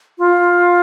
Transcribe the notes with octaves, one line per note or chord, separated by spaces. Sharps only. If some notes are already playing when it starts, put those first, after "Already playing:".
F4